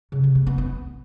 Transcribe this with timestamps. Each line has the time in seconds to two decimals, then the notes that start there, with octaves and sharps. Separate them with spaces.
0.12 C#3
0.24 C3
0.35 A#3
0.47 B3
0.58 B3